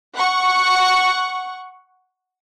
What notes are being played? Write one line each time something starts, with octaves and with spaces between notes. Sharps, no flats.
F#5 C#6